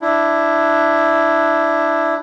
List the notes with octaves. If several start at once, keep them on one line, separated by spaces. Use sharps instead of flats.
D4 E4